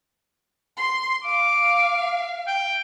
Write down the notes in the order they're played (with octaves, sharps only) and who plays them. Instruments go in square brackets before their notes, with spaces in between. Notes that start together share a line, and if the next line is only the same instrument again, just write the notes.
[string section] C6
[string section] F5 [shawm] D6
[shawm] G5